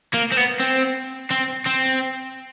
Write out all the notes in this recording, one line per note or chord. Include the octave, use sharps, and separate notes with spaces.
A#3
C4
B3
C4
C4
C4